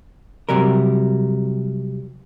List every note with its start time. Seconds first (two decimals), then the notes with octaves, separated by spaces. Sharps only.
0.49 C3 F#3 G3 A#4